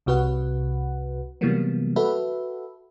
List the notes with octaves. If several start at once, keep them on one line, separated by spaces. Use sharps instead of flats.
C2 C3 F#4 B4 F#5
C3 E3 F#3 G3 A#3 B3
F#4 A4 B4 E5